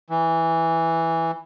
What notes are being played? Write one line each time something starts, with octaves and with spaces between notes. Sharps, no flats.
E3